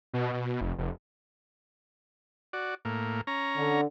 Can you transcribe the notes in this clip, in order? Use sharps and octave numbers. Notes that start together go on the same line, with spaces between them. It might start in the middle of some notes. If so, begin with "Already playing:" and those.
B2
B2
F1
F1
F#4 D5
A2 A#3
C#4 A#5
D3